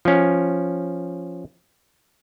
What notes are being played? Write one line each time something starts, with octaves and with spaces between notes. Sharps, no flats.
F3 C#4